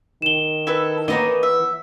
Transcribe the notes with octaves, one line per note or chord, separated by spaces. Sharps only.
D#3 E7 G7
E4 A4 B4
E3 A#3 B3 D#4 C#5 D#5
E5